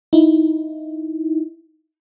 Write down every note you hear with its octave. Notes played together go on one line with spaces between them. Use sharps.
D#4 E4